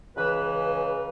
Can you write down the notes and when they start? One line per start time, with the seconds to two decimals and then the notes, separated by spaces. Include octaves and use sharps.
0.16 C#2 C#3 E3 B4